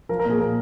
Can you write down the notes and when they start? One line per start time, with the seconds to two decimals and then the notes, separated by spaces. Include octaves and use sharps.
0.09 F3 A#4
0.19 A#4
0.25 A#2 G#4
0.40 A#2 A#4